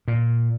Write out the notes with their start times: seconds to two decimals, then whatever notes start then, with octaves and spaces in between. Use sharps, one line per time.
0.08 A#2